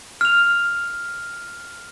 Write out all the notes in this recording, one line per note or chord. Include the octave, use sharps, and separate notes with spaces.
F6 F7